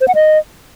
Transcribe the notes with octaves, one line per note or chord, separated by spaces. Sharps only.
C5
F#5
D#5